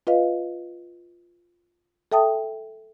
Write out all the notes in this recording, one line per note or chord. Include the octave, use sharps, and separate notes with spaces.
F4 B4 D#5 F5
A4 E5 G5 A5 D#6